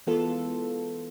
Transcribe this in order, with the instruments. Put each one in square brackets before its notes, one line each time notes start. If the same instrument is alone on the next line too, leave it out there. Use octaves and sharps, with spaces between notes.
[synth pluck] E3 G#3 B3 F4 A4